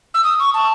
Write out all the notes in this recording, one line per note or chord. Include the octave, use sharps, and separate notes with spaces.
E6
D#6
C#6
A5